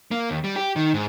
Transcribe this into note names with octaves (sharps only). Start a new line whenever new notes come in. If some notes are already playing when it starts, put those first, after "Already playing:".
A#3
D#2
G3
G4
D#3
G#2